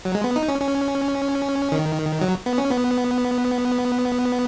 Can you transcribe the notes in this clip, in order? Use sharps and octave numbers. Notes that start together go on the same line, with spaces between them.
F#3
G#3
B3
D#4
C#4
C#4
D#3
F#3
B3
C#4
B3